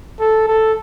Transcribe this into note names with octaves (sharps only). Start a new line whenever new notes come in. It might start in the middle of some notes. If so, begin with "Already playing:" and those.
A4
A4